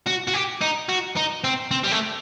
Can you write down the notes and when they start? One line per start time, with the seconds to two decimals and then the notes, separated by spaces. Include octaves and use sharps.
0.06 F#4
0.27 F#4
0.34 G4
0.61 D#4
0.89 F#4
1.17 D#4
1.44 C4
1.71 C4
1.84 G3
1.92 A3